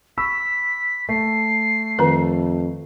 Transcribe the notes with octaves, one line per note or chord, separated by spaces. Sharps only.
B5 C#6 E6 B6
A3 C7
F2 D#3 B4